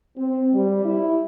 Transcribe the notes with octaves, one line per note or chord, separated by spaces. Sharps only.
C4
G3
E4